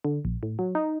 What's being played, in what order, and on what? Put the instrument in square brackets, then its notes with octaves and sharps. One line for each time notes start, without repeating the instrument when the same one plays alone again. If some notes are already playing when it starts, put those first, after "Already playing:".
[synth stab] D3
A#1
A2
F#3
D#4